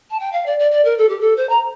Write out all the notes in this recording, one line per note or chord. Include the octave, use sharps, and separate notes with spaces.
A5
G5
F5
D5
D5
D5
A#4
A4
G4
A4
C5
A#5